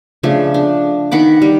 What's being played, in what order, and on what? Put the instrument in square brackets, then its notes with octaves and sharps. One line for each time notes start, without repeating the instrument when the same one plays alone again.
[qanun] C#3 F3 A3 D4
D4
D#3 F#5 B5 D6
G3